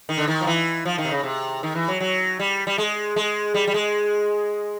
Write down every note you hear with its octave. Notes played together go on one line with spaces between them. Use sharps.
D#3
D3
D#3
F3
E3
F3
D#3
C3
C#3
C3
D#3
E3
F#3
F#3
G3
G3
G#3
G#3
G3
G3
G#3